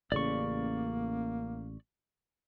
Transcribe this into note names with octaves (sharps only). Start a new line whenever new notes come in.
A1 C#3 A#3 D5 C#6